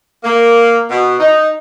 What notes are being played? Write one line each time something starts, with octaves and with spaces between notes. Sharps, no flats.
A#3
B2
D#4